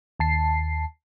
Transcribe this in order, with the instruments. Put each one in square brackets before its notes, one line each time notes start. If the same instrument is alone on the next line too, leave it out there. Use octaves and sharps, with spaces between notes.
[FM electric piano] D#2 A5 C7